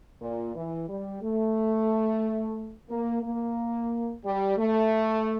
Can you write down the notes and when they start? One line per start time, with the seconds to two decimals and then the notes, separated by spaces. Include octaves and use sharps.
0.21 A#2
0.55 E3
0.88 G3
1.22 A3
2.89 A#3
3.23 A#3
4.25 G3
4.58 A3